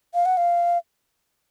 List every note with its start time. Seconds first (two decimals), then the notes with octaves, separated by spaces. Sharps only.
0.14 F5
0.25 F#5
0.37 F5